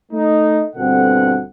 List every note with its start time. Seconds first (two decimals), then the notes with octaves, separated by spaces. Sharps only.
0.12 A3 D#4
0.75 G1 B2 D3 C4 A4 F#5